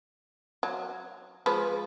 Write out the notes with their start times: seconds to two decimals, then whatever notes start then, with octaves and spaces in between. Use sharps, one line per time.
0.63 F#3
1.46 F3 G#3 B4